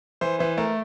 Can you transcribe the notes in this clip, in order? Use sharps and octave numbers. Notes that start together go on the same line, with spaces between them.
E3 C5
E3 C5
A3 A#4